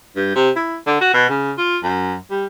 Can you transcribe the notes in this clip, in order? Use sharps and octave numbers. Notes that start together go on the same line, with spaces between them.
G2
C3
E4
D3
F#4
B2
C#3
F4
F#2
G3